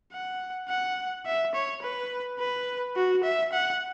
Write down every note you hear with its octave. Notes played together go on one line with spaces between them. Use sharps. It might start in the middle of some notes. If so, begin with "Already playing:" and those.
F#5
F#5
E5
C#5
B4
B4
F#4
E5
F#5